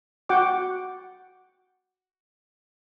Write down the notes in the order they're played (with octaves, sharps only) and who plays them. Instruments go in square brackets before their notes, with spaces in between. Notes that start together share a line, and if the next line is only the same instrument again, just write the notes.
[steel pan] F#4 F#5 G5 D6